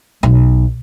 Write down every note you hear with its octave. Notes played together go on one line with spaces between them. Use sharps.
B1